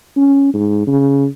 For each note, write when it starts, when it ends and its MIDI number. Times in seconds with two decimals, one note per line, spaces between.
0.16 0.50 61
0.54 0.83 44
0.87 1.26 49